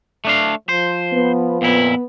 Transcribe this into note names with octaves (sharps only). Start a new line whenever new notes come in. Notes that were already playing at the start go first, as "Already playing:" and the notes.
A3 D4 F5
F3 C5
B3
F2 A#2 B3 E4